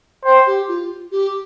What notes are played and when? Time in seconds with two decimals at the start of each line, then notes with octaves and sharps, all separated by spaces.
0.25 C5 G5
0.47 G4
0.68 F4
1.12 G4